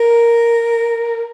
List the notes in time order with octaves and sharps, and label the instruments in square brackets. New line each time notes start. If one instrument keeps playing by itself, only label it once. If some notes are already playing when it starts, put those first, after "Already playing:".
Already playing: [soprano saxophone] A#4